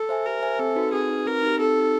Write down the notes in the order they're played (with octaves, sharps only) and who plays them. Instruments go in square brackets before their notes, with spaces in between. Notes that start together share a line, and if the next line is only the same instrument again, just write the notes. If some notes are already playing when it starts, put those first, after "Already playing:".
Already playing: [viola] A4
[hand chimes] C5 E5 G#5
[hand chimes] G4 [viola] A#4
[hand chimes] C5 E5 G#5
[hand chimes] C4 [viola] A4
[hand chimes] D#4 F#4 B4
[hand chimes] C4 [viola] G#4
[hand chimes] D#4 F#4 B4
[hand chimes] C4 [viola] A#4
[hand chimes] D#4 G4
[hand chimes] C4 [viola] A4
[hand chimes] D#4 G4